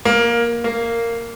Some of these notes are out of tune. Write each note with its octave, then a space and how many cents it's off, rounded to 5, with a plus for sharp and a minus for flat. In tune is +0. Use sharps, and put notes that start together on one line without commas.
A#3 +10
A#3 -10